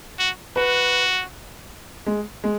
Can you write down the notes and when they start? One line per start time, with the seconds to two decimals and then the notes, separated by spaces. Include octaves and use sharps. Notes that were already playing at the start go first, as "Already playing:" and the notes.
0.19 F#4
0.56 F#4 B4
2.06 G#3
2.44 G#3